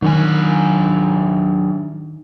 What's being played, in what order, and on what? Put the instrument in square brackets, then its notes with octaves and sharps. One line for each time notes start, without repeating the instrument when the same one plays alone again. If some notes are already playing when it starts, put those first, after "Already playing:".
[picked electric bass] D#3 [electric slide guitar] F#3 D4 G#5